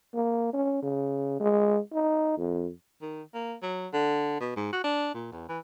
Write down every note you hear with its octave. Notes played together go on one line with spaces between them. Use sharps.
A#3
C#4
C#3
G#3
D#4
F2
D#3
A#3
F#3
D3
B2
G#2
F#4
D4
A#2
E2
E3